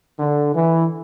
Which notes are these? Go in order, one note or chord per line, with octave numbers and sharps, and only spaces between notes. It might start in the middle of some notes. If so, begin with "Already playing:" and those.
D3
E3